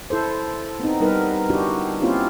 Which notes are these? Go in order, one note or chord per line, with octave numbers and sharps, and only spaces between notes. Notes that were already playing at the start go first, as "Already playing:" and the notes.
E4 A4 C5
B3 C4 D#4
G3 B3 D#4 A#4 B4
D4 E4 F#4 G4
A#3 C4 C#4 E4 F4 G4